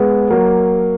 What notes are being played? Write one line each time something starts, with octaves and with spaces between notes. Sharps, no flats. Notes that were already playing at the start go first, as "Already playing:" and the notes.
Already playing: G#3 B3
F#3 A#3